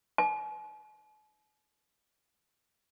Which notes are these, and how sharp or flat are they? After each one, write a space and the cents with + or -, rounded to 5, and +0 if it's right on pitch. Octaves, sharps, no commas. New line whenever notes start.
G#5 +45